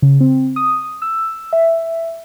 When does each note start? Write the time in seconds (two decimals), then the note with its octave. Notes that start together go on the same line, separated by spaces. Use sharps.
0.02 C#3
0.21 C4
0.56 D#6
1.02 E6
1.53 E5